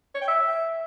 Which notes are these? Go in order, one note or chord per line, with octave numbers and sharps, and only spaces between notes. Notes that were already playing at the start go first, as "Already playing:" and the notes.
C#5
G5
E5